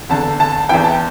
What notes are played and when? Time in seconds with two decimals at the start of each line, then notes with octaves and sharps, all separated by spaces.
0.09 E2 D3 A5
0.40 A5
0.69 E2 E3 G5
0.84 A5